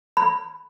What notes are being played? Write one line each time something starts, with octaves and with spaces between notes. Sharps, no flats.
B5